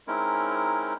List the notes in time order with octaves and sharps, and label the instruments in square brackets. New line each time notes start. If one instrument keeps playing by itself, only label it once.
[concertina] G#3 C4 C#4 D#4 E4 A#4